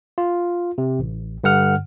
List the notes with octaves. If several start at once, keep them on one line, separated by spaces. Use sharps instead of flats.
F4
C3
A1
G2 D3 F#5 F6